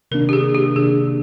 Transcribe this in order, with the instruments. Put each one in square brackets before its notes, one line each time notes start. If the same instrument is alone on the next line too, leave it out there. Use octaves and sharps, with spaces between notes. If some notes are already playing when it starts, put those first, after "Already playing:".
[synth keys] C3 D#3 A#3 D4 [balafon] A#4
[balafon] G4
G#4
G4
[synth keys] C3 D#3 A#3 D4 [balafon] G#4